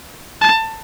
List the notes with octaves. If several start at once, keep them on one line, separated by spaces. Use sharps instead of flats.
A5